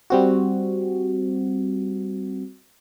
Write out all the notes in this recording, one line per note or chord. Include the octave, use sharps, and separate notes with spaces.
G3 C4 F#4